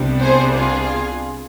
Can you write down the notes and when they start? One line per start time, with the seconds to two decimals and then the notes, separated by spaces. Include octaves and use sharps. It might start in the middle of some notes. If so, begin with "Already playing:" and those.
Already playing: C2 C3 G3 B3 D4
0.21 G#4 C5
0.56 F4 G#4